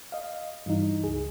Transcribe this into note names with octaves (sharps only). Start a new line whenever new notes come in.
D#5 F5
G2 E3 D#4
C#2 G#4